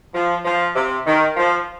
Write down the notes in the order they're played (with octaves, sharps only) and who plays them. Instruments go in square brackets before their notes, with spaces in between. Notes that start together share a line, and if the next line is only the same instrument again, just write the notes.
[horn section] F3
F3
C3
D#3
F3